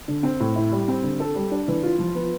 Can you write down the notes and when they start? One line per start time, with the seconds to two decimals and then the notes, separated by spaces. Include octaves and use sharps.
0.08 D3
0.23 C4
0.40 A2
0.56 E4
0.72 G3
0.88 C4
1.03 D3
1.20 A4
1.35 G3
1.51 D4
1.68 E3
1.83 F4
1.99 F3
2.15 B3